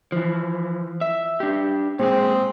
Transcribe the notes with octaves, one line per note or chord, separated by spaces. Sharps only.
E3 F3
E5
D4 G4
A#2 G#3 C4 G#4